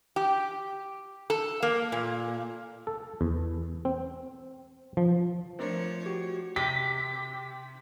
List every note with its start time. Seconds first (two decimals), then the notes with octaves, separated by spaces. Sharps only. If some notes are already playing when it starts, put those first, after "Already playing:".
0.16 G4
1.30 A4
1.63 A#3
1.92 A#2
2.87 A4
3.21 E2
3.85 C4
4.97 F3
5.59 F3 A3 C4 D4 A#4 C#5
6.06 F#4 G4
6.56 C3 G4 B6